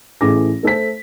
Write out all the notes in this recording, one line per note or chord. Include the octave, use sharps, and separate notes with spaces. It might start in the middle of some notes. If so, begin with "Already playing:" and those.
A1 E3 A3 G#4 D6 A#6
A3 A4 C5 B6